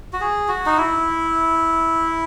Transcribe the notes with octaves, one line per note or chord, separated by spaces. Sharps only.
F#4
G#4
F#4
D#4
E4